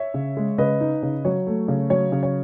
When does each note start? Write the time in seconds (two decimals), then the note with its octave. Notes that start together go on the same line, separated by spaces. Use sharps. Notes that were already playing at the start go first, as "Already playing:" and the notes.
Already playing: C#5 E5
0.14 C#3
0.37 G#3
0.58 C#3 B4 D#5
0.81 D#4
1.03 C#3
1.25 F#3 C#5
1.47 A3
1.68 C#3
1.90 F#3 C#5
2.12 C#3
2.23 C#5